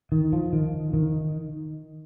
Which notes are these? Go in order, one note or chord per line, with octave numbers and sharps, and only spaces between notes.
D#3
F3
D#3
D#3